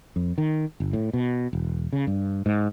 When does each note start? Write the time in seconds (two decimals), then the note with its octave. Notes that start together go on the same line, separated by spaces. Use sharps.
0.16 F2
0.38 D#3
0.80 G1
0.93 A2
1.13 B2
1.53 E1
1.93 C#3
2.07 G2
2.46 G#2